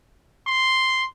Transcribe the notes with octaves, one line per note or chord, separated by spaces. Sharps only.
C6